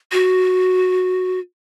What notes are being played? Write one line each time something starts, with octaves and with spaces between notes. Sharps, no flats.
F#4